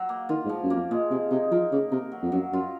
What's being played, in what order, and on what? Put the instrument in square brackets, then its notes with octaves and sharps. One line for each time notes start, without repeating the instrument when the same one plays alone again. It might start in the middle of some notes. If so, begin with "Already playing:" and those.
Already playing: [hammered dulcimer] F#3
A#3
[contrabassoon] D#3 [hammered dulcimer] F4
[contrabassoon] G#2
[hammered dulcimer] F3
[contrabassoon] F#2
[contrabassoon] F2 [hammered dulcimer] A#3
[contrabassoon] A#2 [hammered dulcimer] G#3
[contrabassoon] C3 [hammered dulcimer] G#3
[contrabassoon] C3 [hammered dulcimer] D#4
[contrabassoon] F3 [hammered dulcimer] A#4
[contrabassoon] C#3 [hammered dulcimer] A#3
[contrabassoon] C3 [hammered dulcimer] A#4
[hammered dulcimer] F#3
[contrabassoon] F2
[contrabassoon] F#2 [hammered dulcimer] F#3
[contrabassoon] F#2 [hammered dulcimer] F4